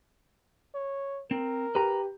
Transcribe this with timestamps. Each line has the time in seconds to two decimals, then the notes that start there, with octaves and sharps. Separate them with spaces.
0.74 C#5
1.31 C4 A#4
1.75 G4 B4 A#5